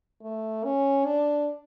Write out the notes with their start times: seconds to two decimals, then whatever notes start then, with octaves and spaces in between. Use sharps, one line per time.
0.22 A3
0.64 C#4
1.05 D4